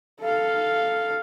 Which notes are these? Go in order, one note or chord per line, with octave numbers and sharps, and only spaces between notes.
A4 F5